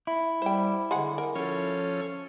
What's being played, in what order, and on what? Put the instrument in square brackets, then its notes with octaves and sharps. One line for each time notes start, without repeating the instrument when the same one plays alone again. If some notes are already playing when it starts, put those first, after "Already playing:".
[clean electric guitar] E4
[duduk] G3 [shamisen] C5 G5
[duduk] D3 [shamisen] G#3 G#4 F#5
[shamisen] A#4
[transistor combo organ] F3 C#4 C#5 [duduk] A4